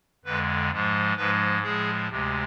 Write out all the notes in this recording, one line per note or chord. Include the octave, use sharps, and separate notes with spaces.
F2 D3 G#3 B4
G#2 F3 G#3
G#2 F3 G#3 B4
A2 F3 G#3 G#4
D2 C3 G#3